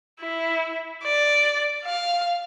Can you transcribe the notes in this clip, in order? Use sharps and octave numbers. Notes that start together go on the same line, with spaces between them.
E4
D5
F5